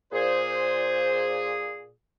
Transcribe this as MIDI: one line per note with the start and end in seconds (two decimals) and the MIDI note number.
0.13 1.92 46
0.13 1.92 68
0.13 1.62 72